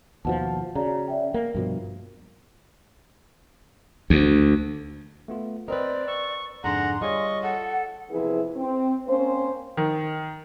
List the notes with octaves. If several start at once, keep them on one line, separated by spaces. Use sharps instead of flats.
D#2 B2 F3 F#5 A5
C#3 F#4 D5 A#5
D5 E5 G5
A#3 A#4 F5
G2 B2 F3
D2
A3 B3 F4
C4 A#4 B4 D5 D#5
C#6 E6
F2 G#2 D3 D4 G#4 F#5 A#5 C6
G3 F4 G#4 C#5 D#5 C#6
A4 F#5
E2 C3 F3 E4 G#4 B4
C4
A#3 C4 C#4 C5
D#3